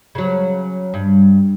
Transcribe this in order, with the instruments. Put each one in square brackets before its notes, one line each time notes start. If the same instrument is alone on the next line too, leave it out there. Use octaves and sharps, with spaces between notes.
[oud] C#3 F#3
G2